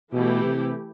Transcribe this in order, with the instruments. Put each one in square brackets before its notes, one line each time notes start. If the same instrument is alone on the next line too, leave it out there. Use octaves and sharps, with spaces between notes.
[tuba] B2 [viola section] E3 A3 E4 G4
[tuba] C3